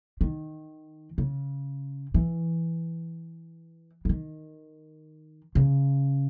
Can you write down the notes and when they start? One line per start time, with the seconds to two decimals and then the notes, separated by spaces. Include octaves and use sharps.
0.21 D#3
1.18 C#3
2.14 E3
4.05 E3
4.09 D#3
5.55 C#3